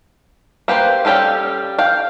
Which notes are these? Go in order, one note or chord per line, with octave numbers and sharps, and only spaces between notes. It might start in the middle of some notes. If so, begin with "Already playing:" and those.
A#3 G4 B4 C5
G3 C#4 G4 A4 F5
F5 G5